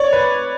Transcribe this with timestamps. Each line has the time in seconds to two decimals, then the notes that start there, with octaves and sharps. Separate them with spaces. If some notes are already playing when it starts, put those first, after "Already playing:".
Already playing: C#5 D5
0.13 B4